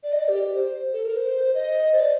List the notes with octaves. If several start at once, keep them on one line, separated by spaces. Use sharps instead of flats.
D5
D#5
D5
G4
C5
A4
A#4
C5
D#5
C5
D5